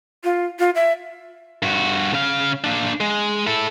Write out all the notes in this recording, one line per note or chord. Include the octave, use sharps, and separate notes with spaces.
F4
F4
E5
G2 F#4
C#3 F5
A#3 D4
G#3
E4 A4